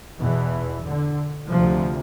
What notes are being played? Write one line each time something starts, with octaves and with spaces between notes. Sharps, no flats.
E2 B2 E3
D3
D2 C3 F3